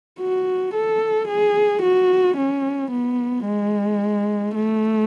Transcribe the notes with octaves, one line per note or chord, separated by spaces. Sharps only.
F#4
A4
G#4
F#4
C#4
B3
G#3
A3